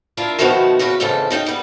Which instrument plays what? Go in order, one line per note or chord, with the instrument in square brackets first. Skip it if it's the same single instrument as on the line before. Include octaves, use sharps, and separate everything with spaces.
[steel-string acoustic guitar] D4 E4 F4 A#4
B2 D#3 F3 A3 B3 F#4
E2 C#3 F#4 B4
F2 G#2 C#3 E3 A4
C#3 D#4 G5
G3 B3